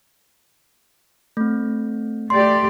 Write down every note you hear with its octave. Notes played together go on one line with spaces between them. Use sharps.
A3 C4
A3 G4 D5 C6